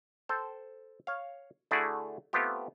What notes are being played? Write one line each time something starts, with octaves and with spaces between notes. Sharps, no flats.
A4 C5 G5
C#5 F5
D3 A3 E4 F#4 G#4 D5
A3 B3 C4 F4 G4